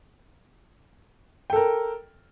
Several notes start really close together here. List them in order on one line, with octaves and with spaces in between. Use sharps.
G5 A4 A#4